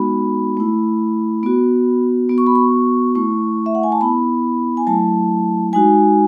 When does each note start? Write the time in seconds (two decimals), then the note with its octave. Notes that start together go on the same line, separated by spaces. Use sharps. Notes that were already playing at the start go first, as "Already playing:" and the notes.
Already playing: G#3 B3 D#4 F#4 B5
0.57 A3 E4
1.43 B3 F#4
2.29 B3 F#4
2.38 C#6
2.47 B5
2.55 C#6
3.15 A3 E4 C#6
3.66 E5
3.75 F#5
3.83 G#5
3.92 A5
4.01 B3 E4 B5
4.77 G#5
4.87 F#3 A3 E4 A5
5.73 G#3 D#4 F#4 G#5